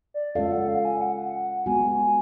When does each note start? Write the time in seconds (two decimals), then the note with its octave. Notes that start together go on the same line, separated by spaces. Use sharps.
0.14 D5
0.35 G#3 C#4 F4 A4 F5
0.52 F#5
0.68 F5
0.85 G#5
1.01 F#5
1.66 G#3 B3 F#4 G#5